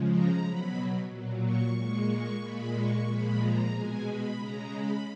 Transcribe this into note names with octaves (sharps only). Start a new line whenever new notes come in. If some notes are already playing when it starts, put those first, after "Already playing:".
Already playing: C#3 F3 G#3
A#5
B2 F#3 B5
A#2 F#3
C#6
A#2 G#3 C#6
C#6
A#2 G#3 B5
C#6
A#2 F3 G#3 B5
A#5
B2 G#3 G#5
B5
C#3 G#3 A#5
B5